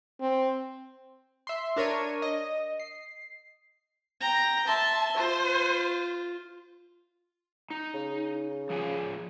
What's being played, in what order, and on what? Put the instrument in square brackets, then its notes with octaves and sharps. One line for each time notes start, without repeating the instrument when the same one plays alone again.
[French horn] C4
[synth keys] E5 C6
D4 A#4 C#5 D#7
D#5
C7
[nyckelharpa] G5 A#5
[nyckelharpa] E5 C6 [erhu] A5
[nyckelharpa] F4 [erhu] C5
[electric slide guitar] D#4
[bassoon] C#3
[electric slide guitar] F3 G#4 G#5